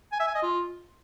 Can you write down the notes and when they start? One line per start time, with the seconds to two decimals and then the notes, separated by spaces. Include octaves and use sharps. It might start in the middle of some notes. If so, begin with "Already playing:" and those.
0.12 G#5
0.20 E5
0.27 G#5
0.35 D#5
0.43 F4